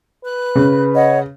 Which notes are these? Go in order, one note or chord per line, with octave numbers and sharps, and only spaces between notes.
B4 F#6
C#3
C#5 D#5 F#5